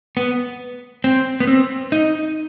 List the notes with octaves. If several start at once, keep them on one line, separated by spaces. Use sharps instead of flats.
B3
C4
B3
C4
D#4